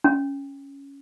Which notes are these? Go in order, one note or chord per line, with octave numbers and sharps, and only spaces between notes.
C#4